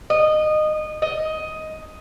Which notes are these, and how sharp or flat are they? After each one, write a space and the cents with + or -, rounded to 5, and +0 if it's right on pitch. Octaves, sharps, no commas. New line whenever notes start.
D#5 -20
D#5 +10